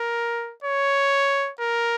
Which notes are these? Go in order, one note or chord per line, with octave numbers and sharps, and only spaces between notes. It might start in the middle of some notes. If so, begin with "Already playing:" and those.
Already playing: A#4
C#5
A#4